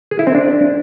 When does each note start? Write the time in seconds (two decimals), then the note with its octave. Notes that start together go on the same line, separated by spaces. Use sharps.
0.11 G#4
0.19 E4
0.27 C4
0.35 D4